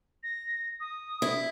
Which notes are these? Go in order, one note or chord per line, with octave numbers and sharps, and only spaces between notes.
A#6
D#6
E4